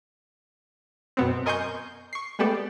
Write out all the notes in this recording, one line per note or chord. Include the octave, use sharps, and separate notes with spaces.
F#2 B2 B3 C4
A#4 D#5 G#5 C6 C#6 G6
C#6 C7
G#3 A3 B3 G4 A4 D5